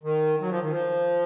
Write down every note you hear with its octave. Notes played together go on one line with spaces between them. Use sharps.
D#3
F#3
F3
D#3
F3